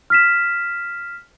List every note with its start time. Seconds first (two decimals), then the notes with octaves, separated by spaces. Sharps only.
0.10 F6 B6 E7